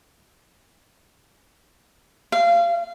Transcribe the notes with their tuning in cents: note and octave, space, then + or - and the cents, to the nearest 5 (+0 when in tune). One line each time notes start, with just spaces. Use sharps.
F5 -25